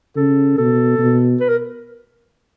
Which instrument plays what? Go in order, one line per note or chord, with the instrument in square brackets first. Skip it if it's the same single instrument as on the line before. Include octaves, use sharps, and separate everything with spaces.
[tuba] C#3 [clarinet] A4
[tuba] B2 [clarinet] A4
[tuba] B2
[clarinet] B4
A#4